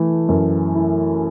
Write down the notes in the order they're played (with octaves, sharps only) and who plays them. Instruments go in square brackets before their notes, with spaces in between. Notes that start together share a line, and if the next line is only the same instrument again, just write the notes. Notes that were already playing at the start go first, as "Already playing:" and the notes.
Already playing: [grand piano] E3 A3
F#2
E4